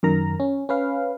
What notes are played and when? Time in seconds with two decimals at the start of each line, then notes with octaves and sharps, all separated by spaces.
0.03 F#2 D#3 A#4 A#5
0.40 C#4
0.69 C#4 B4 F5